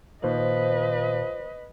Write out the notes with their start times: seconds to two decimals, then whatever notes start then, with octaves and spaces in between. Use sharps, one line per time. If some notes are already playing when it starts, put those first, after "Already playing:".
0.24 A#2 D#3 F3 B4 C5 D#5